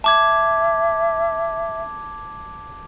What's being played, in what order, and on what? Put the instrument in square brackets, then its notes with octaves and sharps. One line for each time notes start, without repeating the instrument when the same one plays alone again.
[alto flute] E5 [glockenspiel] A5 D6 G#6